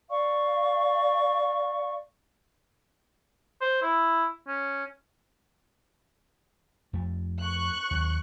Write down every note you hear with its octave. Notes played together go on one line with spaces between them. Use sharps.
D5 F5 C#6
C5
E4
C#4
F2 A3
C#6 F#6
D#2 F#3